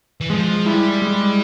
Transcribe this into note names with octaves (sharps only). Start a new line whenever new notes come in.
E3
F3 G#3
G3 E4
G#3